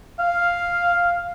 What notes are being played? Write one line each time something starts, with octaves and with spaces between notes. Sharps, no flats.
F5